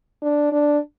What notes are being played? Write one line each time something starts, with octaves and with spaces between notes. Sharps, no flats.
D4
D4